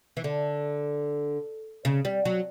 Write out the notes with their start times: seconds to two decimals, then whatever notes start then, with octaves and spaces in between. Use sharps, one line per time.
0.17 E3
0.24 D3
1.85 C#3
2.05 G3
2.25 F#3